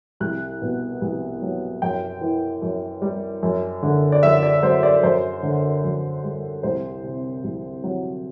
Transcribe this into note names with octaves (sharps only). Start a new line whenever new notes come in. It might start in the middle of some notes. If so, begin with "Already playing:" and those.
C2 F#6
B2
C2
F#3
F#2 G5
E3
F#2
G3
F#2
D3
D5
F#2 E5
D5
F#3 C5
D5
F#2 C5
D3
F#2
G3
C2 C5
C3
C2
F#3